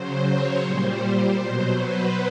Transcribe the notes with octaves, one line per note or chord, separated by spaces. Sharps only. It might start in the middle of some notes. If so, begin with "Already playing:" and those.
Already playing: C#3 F#3 C5
C#5
A#2 G3 C5
B2 F#3 C5
B4